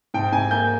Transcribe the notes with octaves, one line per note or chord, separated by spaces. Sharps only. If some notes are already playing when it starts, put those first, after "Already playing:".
G#2 G5
G#2 G#5
A#3 G6